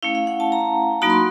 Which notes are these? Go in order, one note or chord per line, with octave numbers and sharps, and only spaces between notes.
A3 C#4 E4 F5
F5
F#5
A5
A#5
F#3 A#3 D#4 F#4 B5
C6